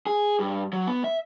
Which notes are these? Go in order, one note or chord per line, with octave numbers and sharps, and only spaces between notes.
G#4
G2
F#3
B3
E5